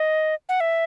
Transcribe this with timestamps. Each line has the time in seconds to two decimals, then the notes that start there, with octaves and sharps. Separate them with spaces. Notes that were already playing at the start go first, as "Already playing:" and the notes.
Already playing: D#5
0.49 F#5
0.60 E5